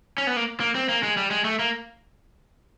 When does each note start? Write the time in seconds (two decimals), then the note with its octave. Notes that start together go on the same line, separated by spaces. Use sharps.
0.18 C#4
0.27 B3
0.36 A#3
0.60 A#3
0.75 C4
0.89 A#3
1.03 G#3
1.17 G3
1.31 G#3
1.45 A3
1.59 A#3